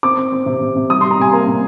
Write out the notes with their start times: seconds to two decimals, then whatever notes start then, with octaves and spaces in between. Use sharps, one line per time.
0.03 C4 D6
0.17 C4
0.32 C4
0.46 C3
0.61 C3
0.76 C3
0.90 G3 D#6
1.01 G3 C6
1.11 A#5
1.19 C3 G#5
1.33 A#3 A#5
1.47 C3